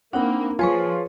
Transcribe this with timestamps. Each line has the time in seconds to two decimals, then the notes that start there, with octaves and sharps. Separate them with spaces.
0.13 A#3 C4 D4 D#4 F#5 B5
0.59 F3 F4 G#4 B4 C#5 G#5 C#6